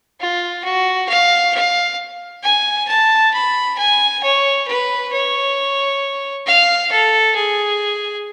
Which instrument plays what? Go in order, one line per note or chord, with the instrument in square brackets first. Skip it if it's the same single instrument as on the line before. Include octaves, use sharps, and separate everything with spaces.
[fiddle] F4
F#4
F5
F5
G#5
A5
B5
G#5
C#5
B4
C#5
F5
A4
G#4